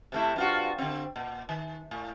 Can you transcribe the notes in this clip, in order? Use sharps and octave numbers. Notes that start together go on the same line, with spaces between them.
C3 A3 E4
G2 F4 F#4
D3 C4
A#2
D#3
A2